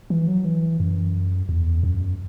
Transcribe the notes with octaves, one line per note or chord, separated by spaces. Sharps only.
E3
F#3
E3
F#2
E2
F#2